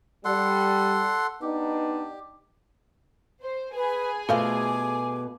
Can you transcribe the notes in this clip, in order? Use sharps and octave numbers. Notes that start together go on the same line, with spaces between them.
G3 A4 F#5 C6
B3 D4 D#4 G4
C5
G#4 B4 G#5
B2 A3 F4 A4 C5 F5 D6